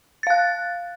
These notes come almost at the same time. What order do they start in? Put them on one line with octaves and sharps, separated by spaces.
A6 F5 F#6